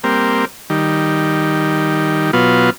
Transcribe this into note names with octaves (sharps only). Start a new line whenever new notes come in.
G3 A#3 C4
D#3 G3
B2 F#3 B3 F4